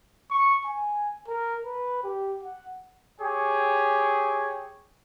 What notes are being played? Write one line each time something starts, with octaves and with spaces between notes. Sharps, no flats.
C#6
G#5
A#4
B4
G4
F#5
G4 G#4 C#5 G5